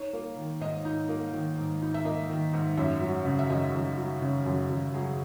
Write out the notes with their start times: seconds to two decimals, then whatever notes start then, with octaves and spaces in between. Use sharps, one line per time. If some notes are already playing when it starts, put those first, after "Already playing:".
Already playing: D#4 C#5
0.13 A#3
0.36 D#3
0.60 G#2 D#5
0.85 D#4
1.09 A#3
1.33 D#3
1.58 G#2
1.82 D#4
1.94 E5
2.05 A#3 D#5
2.30 D#3
2.53 G#2
2.77 F#2 E5
3.01 F#3
3.25 C#3
3.39 E5
3.50 F#2 D#5
3.74 F#2
3.98 F#3
4.22 C#3
4.46 F#2
4.70 F#2
4.94 F#3 G#4